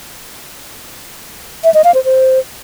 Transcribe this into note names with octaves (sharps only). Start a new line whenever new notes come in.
E5
D#5
F5
C5
C5